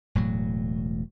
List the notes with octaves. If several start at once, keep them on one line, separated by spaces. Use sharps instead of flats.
E1 A2 F#3